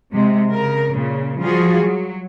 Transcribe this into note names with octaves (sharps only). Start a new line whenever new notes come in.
C3 G#3
C#3 A#4
A#2 C#3
F3 G3 F4 F#4 G#4
F#3